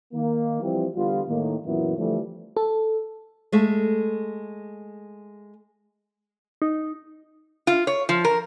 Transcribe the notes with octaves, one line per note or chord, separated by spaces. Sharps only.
D#3 A#3
E3 F3 G3 C4
E2 D3 G3 B3 F4
A2 D#3 A#3
F#2 A#2 E3 F#3 B3 E4
D3 E3 F3 G3 A3
A4
G#3 A3
D#4
F4
C#5
F3
A#4